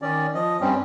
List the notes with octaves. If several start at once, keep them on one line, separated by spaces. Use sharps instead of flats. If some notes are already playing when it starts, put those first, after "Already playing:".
D#3 C#4 D5
F3 D#5
G2 G3 C4 C#4